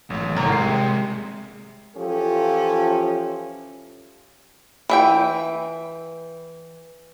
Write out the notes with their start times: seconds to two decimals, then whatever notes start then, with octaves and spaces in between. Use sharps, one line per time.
0.10 A1 F#3 A3
0.36 G#1 A2 C3 F#3 A#4 C#5 F#5
0.52 G3 G#3 C7
1.96 E3 F3 C#4 F4 G4 A4
4.90 E3 E5 G5